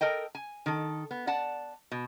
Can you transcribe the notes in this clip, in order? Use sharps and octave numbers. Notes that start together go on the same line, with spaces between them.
A4 A#4 D#5 G5
G#5
D#3 A4
B3
D5 F#5 A5
B2